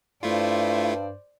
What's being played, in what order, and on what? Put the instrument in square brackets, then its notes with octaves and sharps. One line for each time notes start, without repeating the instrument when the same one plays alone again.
[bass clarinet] G2 [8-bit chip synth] A3 E4 F4 [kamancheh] C5 D5